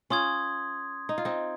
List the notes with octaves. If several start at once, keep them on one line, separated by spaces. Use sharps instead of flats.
C#4 F4 C6 D#6 G#6
D#4
F4
C4 D#4